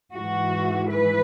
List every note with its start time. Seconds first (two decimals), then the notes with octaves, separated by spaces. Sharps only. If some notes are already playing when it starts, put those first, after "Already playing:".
0.14 G#2 E3 F#4
0.89 B4